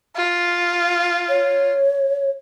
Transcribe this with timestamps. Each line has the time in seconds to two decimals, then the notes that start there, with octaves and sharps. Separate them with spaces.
0.16 F4
1.29 C#5